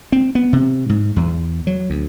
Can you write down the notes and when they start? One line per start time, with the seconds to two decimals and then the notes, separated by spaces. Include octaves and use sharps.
0.12 C4
0.35 B3
0.53 C3
0.89 G#2
1.16 E2
1.67 F#3
1.90 D2